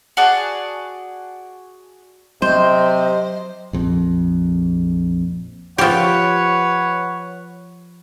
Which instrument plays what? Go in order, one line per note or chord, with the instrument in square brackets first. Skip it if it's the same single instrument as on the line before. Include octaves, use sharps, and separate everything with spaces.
[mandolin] F#4 G#4 D5 A5
[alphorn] C3 [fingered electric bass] F#3 [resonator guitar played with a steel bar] C5 [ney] D#5
[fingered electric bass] A#1 F2
[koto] F3 G4 [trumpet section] B4 C#5 F#5